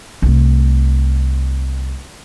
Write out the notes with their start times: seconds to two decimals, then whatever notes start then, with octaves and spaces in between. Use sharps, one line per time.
0.22 C2 A3